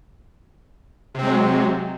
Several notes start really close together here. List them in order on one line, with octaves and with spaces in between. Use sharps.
C3 C4 G#3 F#3